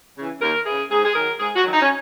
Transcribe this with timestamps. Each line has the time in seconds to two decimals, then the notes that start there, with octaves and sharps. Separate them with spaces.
0.17 C#3 E3
0.42 D#2 A#4
0.66 C#3 E3 G#4
0.91 G#2 G#4
1.05 G#4
1.16 D#3 F#3 A#4
1.39 G#2 G#4
1.56 F#4
1.64 D#3 F#3
1.73 D#4
1.82 C#4